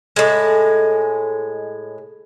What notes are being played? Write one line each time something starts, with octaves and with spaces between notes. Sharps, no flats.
A2 G#3